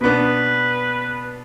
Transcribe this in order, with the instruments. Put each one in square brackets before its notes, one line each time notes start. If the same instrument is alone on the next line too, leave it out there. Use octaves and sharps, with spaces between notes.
[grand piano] B2 B3 D4 [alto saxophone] B4